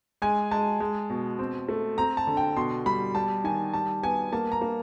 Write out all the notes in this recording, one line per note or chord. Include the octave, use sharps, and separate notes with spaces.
G#3 G#5
G#3 A5
G#3
B2
C4
A3
C4 A#5
A5
D3
G5
B2 C6
G3 B5
G3 A5
D#3 G#5
G3 A5
B3 G#5
A#3 A5
A#5
A#3